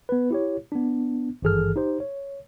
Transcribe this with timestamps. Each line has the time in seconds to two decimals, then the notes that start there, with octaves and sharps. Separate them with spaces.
0.09 B3 B4
0.31 E4 G4 C#5
0.72 B3 D4
1.42 G#1 G2 E3 G#4 A4 F6
1.76 D#4 G4 C5
2.00 C#5